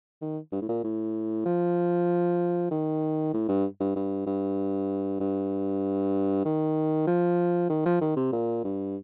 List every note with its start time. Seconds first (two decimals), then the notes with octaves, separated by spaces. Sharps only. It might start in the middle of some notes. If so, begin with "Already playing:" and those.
0.21 D#3
0.52 G2
0.62 A2
0.69 A#2
0.84 A2
1.45 F3
2.71 D#3
3.34 A2
3.49 G2
3.80 G2
3.96 G2
4.27 G2
5.20 G2
6.45 D#3
7.07 F3
7.70 D#3
7.86 F3
8.01 D#3
8.16 C3
8.32 A#2
8.64 G2